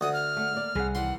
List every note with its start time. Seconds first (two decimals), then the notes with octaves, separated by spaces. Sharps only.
0.01 D2 F#5 D#6
0.13 F6
0.37 A3 D4
0.53 A#3 D5
0.75 C2 C3 G#4 F#5
0.95 D#3 E3 G3 F#5 C6